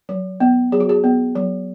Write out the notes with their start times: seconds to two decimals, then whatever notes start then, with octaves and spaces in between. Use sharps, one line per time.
0.09 F#3
0.40 B3
0.72 F#3 G#4
0.80 F#4
0.89 G#4
1.04 B3
1.36 F#3